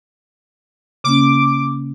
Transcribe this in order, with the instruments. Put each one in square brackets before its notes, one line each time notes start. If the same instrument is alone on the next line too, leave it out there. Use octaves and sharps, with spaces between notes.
[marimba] C#3 A#3 C#4 [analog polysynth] D6